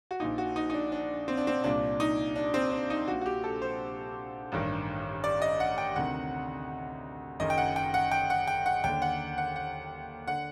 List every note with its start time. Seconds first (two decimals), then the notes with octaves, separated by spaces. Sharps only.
0.11 F#4
0.20 A#1 A#2 D#4
0.38 F#4
0.56 D#4
0.70 D#4
0.74 D4
0.92 D4
1.28 C4
1.37 D4
1.47 C4
1.64 C2 A#2 D4
2.00 D#4
2.36 D4
2.54 C4
2.72 D4
2.90 D#4
3.08 A#1 A#2 F#4
3.21 F#4
3.26 G4
3.44 A4
3.62 C5
4.52 A1 G2 D#3
5.24 D5
5.42 D#5
5.60 F#5
5.78 G5
5.96 D2 C3 D#3 F#5
7.40 F#1 F#2 D#3 D#5
7.50 G5
7.58 F#5
7.76 G5
7.94 F#5
8.11 G5
8.30 F#5
8.47 G5
8.66 F#5
8.84 D#2 D3 G5
9.02 F#5
9.38 F#5
9.56 F#5
10.27 D3 F#5